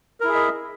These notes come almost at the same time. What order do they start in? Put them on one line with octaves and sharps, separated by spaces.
A#4 E4 G#4 E5 D#5